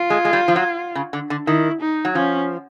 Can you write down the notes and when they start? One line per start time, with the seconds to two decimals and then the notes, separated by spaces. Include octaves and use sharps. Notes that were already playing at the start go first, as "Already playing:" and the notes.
Already playing: F4
0.10 G#3
0.25 G#3
0.33 G3
0.48 F3
0.56 F#3
0.95 C#3
1.13 D3
1.30 D3
1.47 D#3 E4
1.81 D#4
2.05 F#3
2.15 F3 C#4